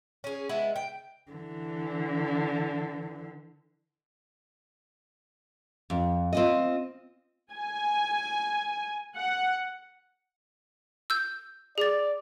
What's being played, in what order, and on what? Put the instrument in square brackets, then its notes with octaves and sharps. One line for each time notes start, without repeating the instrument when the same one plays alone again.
[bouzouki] C#4 G#4
G#3 B3 E4
G5
[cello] D3 E3
[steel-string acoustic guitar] F2
C4 F4 D#5
[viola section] G#5
F#5
[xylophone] E6 G6
[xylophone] G#4 A6 [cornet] D5